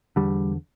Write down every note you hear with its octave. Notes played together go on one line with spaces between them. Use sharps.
E2 D3 G3